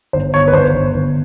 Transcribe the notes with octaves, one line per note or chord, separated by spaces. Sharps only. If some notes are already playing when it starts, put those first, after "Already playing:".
G1 C5
G1 C#5
B4
G1 C5
G1
G1